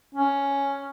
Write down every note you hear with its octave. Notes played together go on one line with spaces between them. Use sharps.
C#4